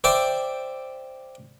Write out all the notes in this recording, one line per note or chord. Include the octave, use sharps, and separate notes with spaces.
C5 D5 E5 G5 D6